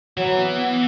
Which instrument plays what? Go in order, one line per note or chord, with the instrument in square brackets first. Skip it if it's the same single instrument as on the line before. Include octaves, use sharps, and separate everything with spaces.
[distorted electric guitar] E3 [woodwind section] F#3
[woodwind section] B3
B3